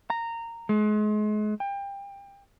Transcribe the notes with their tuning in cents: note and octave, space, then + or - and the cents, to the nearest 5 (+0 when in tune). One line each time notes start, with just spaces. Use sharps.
A#5 -15
G#3 +35
G5 +25